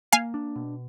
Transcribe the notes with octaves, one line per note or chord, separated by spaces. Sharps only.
A#3 F5 G#5
D4
B2